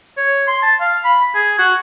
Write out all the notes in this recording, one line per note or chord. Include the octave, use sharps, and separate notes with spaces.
C#5
C6
A5
F5
B5
G#4
F#4